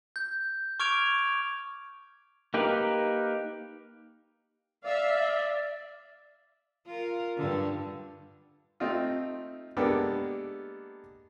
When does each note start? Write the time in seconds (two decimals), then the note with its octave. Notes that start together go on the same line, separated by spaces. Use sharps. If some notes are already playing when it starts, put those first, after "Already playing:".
0.16 G6
0.80 C#6 D6 F6 G#6 D7 F7
2.54 A#3 D#4 G4 A#4 B4
4.84 D5 E5 F5
6.86 F4 A#4
7.37 G2 D3
8.80 A3 C4 D#4 F4
9.77 G#3 A#3 B3 D4 G4 A4